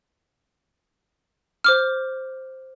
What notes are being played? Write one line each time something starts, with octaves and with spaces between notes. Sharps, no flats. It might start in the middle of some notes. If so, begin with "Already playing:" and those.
C5 D6 F6